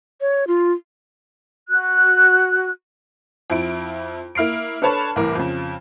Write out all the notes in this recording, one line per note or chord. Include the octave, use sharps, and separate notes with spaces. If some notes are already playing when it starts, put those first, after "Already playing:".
C#5
F4
F#4 F#6
F2 E4 D7
A#3 E4 F6 C7 D7
D4 A4 B4 C#5 A5 B5
C2 A2 E3 A#4 D6
F2 C#3